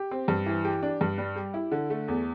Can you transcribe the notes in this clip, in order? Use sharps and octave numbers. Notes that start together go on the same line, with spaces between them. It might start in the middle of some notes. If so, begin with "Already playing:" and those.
Already playing: G4
C4
G2
E3
G4
D4
G2
G3
G4
E4
D3
A3
E2